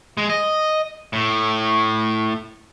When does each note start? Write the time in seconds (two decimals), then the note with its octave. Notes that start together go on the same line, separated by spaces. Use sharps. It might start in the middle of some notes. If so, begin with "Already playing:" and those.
0.17 G#3
0.30 D#5
1.13 A2